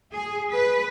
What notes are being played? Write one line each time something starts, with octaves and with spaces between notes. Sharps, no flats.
G#4
B4